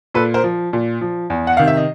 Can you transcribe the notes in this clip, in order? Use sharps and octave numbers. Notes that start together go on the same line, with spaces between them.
A#2 A4 B4
A#4 C5
F3
A#2
F3
E2
F#5
C3 D#3 F5
E5
D#5